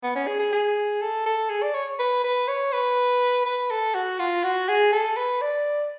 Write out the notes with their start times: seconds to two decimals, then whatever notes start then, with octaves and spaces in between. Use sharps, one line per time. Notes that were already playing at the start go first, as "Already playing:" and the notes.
0.03 B3
0.15 C#4
0.27 G#4
0.39 G#4
0.52 G#4
1.01 A4
1.26 A4
1.49 G#4
1.63 D5
1.74 C#5
1.99 B4
2.24 B4
2.48 C#5
2.72 B4
3.46 B4
3.71 A4
3.94 F#4
4.19 F4
4.44 F#4
4.69 G#4
4.92 A4
5.17 B4
5.41 D5